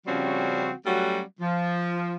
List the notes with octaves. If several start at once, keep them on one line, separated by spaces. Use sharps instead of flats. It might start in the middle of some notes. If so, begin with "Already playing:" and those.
C#3 F3 G3 C4 C#4 F#4
F#3 G3 A3 C#4 F#4
F3